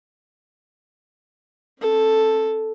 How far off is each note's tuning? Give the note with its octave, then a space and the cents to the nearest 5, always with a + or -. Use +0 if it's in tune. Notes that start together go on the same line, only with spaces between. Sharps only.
C4 +35 A4 +0